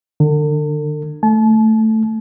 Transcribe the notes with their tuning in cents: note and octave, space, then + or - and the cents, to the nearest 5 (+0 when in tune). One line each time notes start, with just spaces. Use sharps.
D3 +30 A4 +45
A3 +5 A5 -35